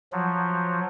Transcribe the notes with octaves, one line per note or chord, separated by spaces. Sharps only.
F3 F#3